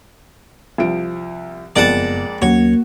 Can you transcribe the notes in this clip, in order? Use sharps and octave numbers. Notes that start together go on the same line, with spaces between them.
C2 F3 D7
F#1 F2 G#3 A#3 B3 D5 F#5 A5
D#2 F#3 A#3 C#4 F#4 C#5